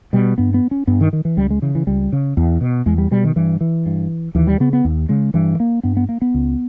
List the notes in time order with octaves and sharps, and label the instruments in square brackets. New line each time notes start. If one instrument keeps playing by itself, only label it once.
[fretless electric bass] B2 G3
G2 B3
B3
C#4
G2 B3
D#3
D#3
E3
C#2 G3
G#3
C#3 E3
E3
C#2 G3
C#3
E2
B2
E2 G#3
G3
B2 G3
D#3
G2 E3
E3
G2
D#2 E3
G3
C#3 B3
B3
D#2
C#3 G#3
G2 E3
A#3
G2 B3
B3
A#3
B3
C#2